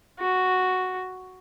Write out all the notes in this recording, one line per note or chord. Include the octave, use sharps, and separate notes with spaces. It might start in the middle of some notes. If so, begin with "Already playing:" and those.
F#4